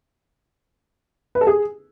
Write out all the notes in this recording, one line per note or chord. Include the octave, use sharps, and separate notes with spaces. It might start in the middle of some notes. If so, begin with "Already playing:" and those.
B4
A4
G#4